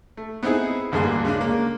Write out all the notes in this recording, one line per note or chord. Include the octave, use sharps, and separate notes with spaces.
A3
B3 C4 D#4 E4 G#4
A1 D2 G2 A#3 G#4 C6
C#3 G#3 D4
A#3 A#4